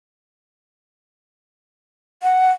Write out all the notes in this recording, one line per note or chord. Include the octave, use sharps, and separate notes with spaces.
F#5